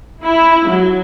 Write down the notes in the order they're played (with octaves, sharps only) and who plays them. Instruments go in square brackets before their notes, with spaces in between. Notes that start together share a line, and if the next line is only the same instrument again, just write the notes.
[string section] E4
F#3